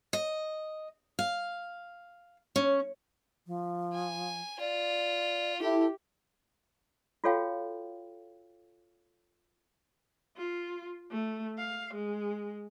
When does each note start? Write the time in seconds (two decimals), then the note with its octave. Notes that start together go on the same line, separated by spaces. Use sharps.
0.13 D#5
1.19 F5
2.56 C#4
3.47 F3
3.94 G#5
4.60 F4 D5
5.61 E4 G4 A4
7.24 F4 F#4 A4 C#5 F5 G5
10.37 F4
11.11 A3
11.58 F5
11.94 G#3